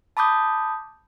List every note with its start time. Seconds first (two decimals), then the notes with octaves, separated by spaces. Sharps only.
0.17 A5 B5 D6 D#6 G6